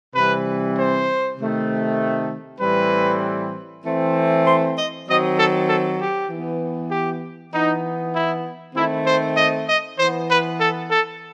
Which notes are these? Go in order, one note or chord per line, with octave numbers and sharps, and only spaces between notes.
C3 E3 G3 C4 B4
C5
C3 D#3 A3
A2 E3 G3 C4 B4
E3 A3 C4
C5
D#5
D#3 F#3 C4 D#5
A4
A4
G4
E3 B3
G4
E3 B3 D#4
E4
D#3 A3 C4 E4
C5
D#5
D#5
E3 B3 C5
B4
A4
A4